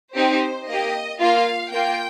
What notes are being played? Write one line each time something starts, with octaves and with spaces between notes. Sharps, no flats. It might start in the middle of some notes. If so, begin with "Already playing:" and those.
C4 D#4 G4 C5
A#3 G4 D#5
A#3 F4 F5
A#3 F4 G5